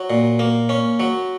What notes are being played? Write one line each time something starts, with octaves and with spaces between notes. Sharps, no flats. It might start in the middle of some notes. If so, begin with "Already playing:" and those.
Already playing: F#3
A#2
A#3
C#4
F#3